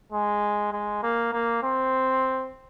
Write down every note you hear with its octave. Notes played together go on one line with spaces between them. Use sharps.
G#3
G#3
A#3
A#3
C4